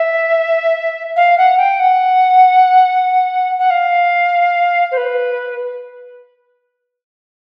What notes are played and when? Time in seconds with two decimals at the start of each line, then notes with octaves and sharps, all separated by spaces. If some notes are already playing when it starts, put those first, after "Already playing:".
Already playing: E5
1.16 F5
1.38 F#5
1.58 G5
1.79 F#5
3.58 F#5
3.70 F5
4.92 C5
4.97 B4